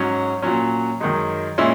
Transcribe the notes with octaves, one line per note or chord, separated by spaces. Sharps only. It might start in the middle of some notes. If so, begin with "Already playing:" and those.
Already playing: G#2 F#3 C#4
A#2 F#3 C#4
F#2 D#3 G#3 D#4
A#2 G#3 C#4 E4